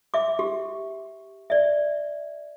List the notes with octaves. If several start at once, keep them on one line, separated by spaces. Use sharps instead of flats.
E5 D6
G4
D5 E5